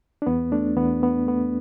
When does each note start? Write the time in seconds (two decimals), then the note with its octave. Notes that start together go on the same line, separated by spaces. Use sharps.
0.22 D4
0.26 E2 B3
0.52 A3 D4
0.77 E2 B3
1.02 E2 B3
1.27 A3 B3